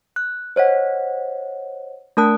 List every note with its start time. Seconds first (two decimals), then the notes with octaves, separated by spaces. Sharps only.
0.16 F#6
0.56 C5 C#5 D#5 F#5
2.17 A3 D4 A#4 A5 D#6 F#6